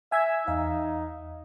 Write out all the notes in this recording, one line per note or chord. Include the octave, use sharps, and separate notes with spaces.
E5 G#5 E6 G#6
E2 D#4 F5